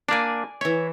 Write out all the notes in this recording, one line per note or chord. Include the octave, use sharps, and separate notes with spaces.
A#3 D4 D5 G#5
E3 C#5 E5